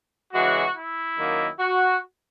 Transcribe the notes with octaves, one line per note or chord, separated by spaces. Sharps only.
C#3 E3 G#3 F#4
E4
F#2 D#3 A#3 D#4
F#4